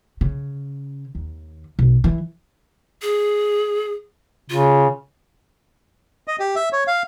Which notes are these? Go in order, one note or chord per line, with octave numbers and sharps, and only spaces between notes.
C#3
D#2
B1
E3
G#4
C#3 F4
D#5
G4
E5
C#5
F5